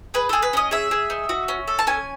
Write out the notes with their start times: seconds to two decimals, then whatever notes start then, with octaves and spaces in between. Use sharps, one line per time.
0.14 G#4 B4
0.29 G#4 A4
0.42 B4
0.53 C#4 D#5
0.71 G#4 E5
0.91 G#4
1.10 D#4
1.29 F#4
1.48 C#4
1.68 A4
1.79 A5
1.87 C#4 G#5